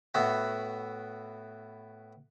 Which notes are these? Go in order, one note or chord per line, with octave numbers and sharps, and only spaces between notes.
A2 B3 F#4 E5